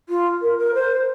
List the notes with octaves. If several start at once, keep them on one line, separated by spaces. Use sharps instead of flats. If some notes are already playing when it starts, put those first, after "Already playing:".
F4
A#4
A#4
C5